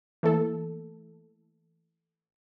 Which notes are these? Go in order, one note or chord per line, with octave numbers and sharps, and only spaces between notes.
E3 A3 A#3 A4